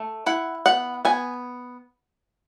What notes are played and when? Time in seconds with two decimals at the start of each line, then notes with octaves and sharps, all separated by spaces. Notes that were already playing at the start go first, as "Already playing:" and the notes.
Already playing: A3
0.26 E4 F#5
0.66 B3 F#5
1.05 B3 G#5